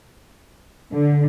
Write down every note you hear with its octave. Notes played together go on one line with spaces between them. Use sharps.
D3